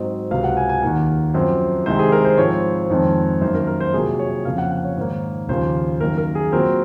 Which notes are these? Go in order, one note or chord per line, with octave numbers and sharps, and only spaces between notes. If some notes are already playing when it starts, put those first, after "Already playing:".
Already playing: G#2 F#3 C4 D#5
C#2 C3 F#3 F5
F#5
G#5
G#5
D#2 D#3 A#3 F#5
F#2 F3 C4
C2 C3 D#3 G#3 C4 C5
G#4
A#4
C5
G#2 F3 C4 C#5
F2 D#3 G#3 C4
F#2 D#3 A#3 C5
A#4
A#4
C5
C2 A#2 F#3 G#4
C#5
F2 C#3 F3 A#3 F5
F#5
F#5
C#5
G#2 D#3 A#3
D#2 C#3 F3 A#3 C5
F#2 D#3 A#3 A#4
A#4
G#4
A#2 F#3 C4 A#4